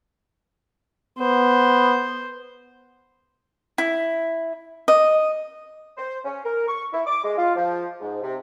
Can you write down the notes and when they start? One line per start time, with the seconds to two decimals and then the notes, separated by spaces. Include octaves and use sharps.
1.19 B3 C5
3.78 E4
4.88 D#5
5.97 C5
6.24 C#4
6.44 A#4
6.68 C#6
6.93 E4
7.06 D6
7.24 G#3
7.37 F4
7.56 F3
8.01 G#2
8.22 C3